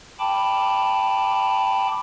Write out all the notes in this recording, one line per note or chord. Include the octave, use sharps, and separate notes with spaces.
G5 A5 B5 D6